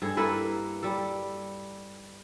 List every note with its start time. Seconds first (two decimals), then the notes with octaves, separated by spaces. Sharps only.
0.02 G2 G#4 A4
0.17 A#3 E4 A4 B4
0.83 G3 A4